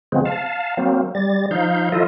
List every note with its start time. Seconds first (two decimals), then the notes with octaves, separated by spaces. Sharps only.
0.12 C#3 F3 G#3 B3 C4
0.25 F5 A5
0.77 F#3 A#3 C4
1.15 G3 A6
1.51 F3 D#4 F5 G6
1.92 F3 E4 F4 A4 D#5